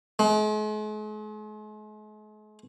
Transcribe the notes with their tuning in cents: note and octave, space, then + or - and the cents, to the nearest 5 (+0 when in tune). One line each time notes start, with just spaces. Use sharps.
G#3 +45